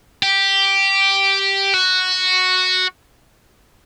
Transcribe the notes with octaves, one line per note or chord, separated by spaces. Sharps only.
G4
F#4